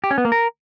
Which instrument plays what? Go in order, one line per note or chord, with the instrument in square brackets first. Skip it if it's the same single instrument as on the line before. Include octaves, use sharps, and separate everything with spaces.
[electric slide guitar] G4
C#4
B3
A#3
A#4